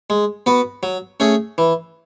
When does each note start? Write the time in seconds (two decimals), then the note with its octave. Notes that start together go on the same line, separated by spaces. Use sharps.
0.10 G#3
0.46 B3 F#4 B4
0.83 F#3
1.20 A3 C#4 G#4
1.58 E3